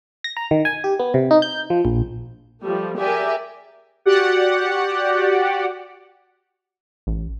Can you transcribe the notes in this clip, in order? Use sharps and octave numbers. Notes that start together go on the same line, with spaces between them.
A#6
A#5
D#3
G#5
G4
B3
C3
D#4
G6
F3
A#1
F3 G3 A3
G4 G#4 A#4 D5 E5 G#5
F#4 G4 D5 F#5
A1